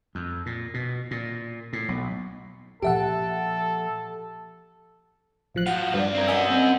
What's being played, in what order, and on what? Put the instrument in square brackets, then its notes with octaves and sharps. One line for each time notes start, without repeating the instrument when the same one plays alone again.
[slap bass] F2
A#2
B2
A#2
A2
B1
[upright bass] A#2 F3 [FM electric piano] G4 E5 F#5 [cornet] A4
[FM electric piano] A1 F3 F#6
[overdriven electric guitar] F#3 F4 [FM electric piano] F#5
[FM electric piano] G2 [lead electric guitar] B4 D5
[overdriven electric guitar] C4 A#4
[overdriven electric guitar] C#4 F#5 [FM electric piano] D#5 G#5 E6
[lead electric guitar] C4